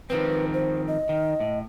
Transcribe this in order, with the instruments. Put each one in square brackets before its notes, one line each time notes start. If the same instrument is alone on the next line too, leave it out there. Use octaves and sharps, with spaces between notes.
[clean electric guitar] D#3 F3 C4 [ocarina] B4
[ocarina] C5
D#5
[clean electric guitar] D#3
A2